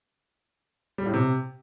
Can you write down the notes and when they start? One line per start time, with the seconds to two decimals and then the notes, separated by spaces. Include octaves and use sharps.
0.98 G3
1.06 A2
1.14 C3